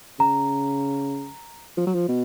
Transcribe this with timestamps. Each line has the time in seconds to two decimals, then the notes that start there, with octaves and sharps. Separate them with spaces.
0.19 C#3 A#5
1.77 F3
1.87 F#3
1.95 F3
2.09 B2